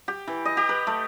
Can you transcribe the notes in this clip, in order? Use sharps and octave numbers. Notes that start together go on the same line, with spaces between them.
G4
E3
D#5
G4
B4
A3